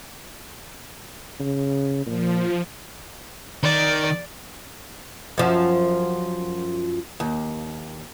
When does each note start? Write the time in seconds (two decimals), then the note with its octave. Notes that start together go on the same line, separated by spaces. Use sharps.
1.40 C#3
2.06 A#2 F3
3.63 D#3 D5
5.38 F#2 F3
7.20 D#2